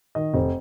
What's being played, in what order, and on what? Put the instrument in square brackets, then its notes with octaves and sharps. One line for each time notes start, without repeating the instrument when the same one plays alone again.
[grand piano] D#3 D#5
F1 C5